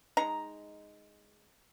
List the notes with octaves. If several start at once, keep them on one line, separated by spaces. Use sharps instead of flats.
G#3 D#4 A#5